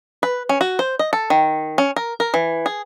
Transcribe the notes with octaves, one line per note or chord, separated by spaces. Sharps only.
B4
C#4
F#4
C5
D#5
A4
D#3
C#4
A#4
A#4
E3
G#4